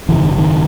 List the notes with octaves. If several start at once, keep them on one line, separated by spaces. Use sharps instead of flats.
G#1 F#2 C#3 E3
D#3
D#3